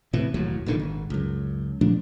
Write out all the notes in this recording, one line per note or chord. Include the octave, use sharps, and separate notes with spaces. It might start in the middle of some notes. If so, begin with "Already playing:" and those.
A2 C3 E3
E1 D#2 A2 F#3
F1 A#2 D3 D#3
G#1
C#2 F#2
A#2 F3 A3 D4